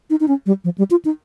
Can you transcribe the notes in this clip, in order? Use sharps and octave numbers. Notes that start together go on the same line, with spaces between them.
D#4
D#4
C#4
G3
F3
G3
F4
D#4